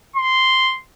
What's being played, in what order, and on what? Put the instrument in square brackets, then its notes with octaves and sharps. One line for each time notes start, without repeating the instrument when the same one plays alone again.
[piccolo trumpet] C6